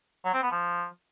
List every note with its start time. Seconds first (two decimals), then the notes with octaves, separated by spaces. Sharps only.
0.25 F#3
0.33 C4
0.42 B3
0.51 F3